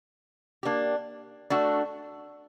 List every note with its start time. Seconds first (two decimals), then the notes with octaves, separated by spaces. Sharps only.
0.63 A#3 D4 G4
1.50 A3 D4 F#4